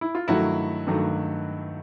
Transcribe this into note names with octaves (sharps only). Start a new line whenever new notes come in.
E4
F4
G2 D#3 F#3 A3 E4 F#4
G2 D#3 F#3 A3